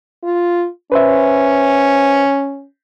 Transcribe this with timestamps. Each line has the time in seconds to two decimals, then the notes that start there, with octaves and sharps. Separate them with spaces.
0.23 F4
0.92 C#4 B4 C5 E5